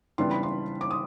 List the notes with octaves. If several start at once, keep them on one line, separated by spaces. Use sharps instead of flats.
C#3 E3 G3 B3 D4 C6
B5
C6
D6
D#6